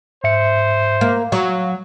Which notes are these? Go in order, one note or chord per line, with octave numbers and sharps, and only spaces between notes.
G#2 C5 E5 C#7
A#3
F#3 F5